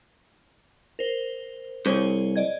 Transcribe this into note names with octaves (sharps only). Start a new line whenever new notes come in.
A#4 C5
C2 G#4 C5 C#5
D5 D#5 G#6